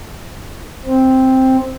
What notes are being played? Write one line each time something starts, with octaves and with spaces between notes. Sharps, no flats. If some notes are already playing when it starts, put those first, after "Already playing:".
C4